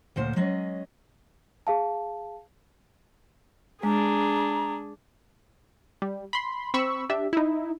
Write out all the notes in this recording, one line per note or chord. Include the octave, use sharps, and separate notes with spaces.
D2 A#2 C5
F#3 G#3 C#4 D#5
G#4 F5 A5
G#3 D4 G#4 A#5
G3
B5 C6
C4 B5 C#6 E6
D4 G4 E5
D#4 E4